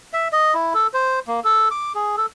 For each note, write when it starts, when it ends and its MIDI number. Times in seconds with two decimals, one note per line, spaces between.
0.13 0.28 76
0.33 0.54 75
0.54 0.73 64
0.74 0.87 69
0.94 1.20 72
1.28 1.40 58
1.44 1.69 69
1.71 1.93 86
1.95 2.16 68
2.17 2.26 69